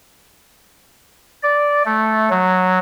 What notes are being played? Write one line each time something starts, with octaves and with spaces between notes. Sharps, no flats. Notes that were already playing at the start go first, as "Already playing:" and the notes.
D5
A3
F#3